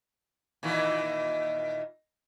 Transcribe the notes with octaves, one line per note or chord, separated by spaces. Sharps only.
A#2 D#3 E3